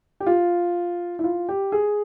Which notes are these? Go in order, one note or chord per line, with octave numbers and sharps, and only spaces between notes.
G4
F4
E4
F4
G4
G#4